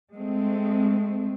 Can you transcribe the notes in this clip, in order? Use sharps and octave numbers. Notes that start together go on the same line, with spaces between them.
G#3 A3 C4